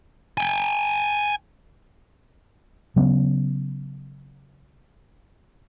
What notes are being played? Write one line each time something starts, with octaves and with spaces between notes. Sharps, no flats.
G5 G#5
C#3 F#3 B3 C#4